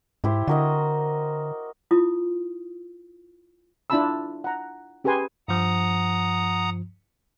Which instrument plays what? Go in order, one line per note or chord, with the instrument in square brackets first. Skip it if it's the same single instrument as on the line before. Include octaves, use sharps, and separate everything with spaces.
[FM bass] G#2 [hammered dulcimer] E4 G4 C5
[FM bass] D3 [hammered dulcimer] F#4 A#4 D#5
[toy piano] E4 F4 D#6
[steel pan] D4 E4 F4 A5 B5 E6
F#5 A#5
C#4 G4 G#4 B4 G#5 C6
[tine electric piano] G2 F3 [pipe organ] F#5 A#5 D#6